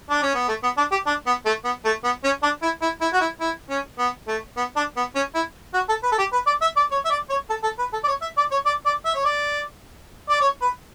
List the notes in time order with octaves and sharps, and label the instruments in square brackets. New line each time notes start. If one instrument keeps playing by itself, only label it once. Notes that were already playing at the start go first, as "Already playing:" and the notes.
[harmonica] D4
C#4
B3
A3
B3
D4
G4
D4
B3
A3
B3
A3
B3
C#4
D4
E4
E4
E4
F#4
E4
E4
C#4
B3
A3
B3
D4
B3
C#4
E4
F#4
A4
B4
A4
G4
B4
D5
E5
D5
C#5
E5
D5
C#5
A4
A4
B4
A4
D5
C#5
E5
D5
C#5
D5
D5
E5
C#5
D5
D5
C#5
B4